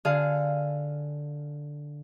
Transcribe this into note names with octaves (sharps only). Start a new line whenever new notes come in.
D3 G#4 F5